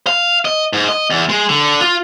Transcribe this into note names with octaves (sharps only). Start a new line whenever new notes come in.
F5
D#5
G#2
D#5
E2
G#3
D3
F4